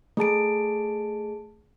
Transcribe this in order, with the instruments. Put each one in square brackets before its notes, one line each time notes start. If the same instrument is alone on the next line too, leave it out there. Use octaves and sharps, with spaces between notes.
[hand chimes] A3 G#4 A5 D7